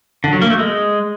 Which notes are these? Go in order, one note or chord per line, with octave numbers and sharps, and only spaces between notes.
D3
F#3
A#3
A3
G#3